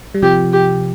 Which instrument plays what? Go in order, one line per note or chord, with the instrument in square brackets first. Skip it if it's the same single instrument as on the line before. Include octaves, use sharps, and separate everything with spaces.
[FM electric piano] G3
[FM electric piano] C3 F3 [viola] G4
[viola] G4